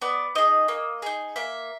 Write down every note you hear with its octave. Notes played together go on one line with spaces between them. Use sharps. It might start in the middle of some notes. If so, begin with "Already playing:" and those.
B3 D5
D#4 G#4 D#5
A#3
D#4 G#4
A#3 E5